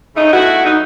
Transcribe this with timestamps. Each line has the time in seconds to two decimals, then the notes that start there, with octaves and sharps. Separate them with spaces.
0.16 C#3 F#3 A3 D#4
0.33 A3 B3 E4 F#4
0.66 F#3 D#4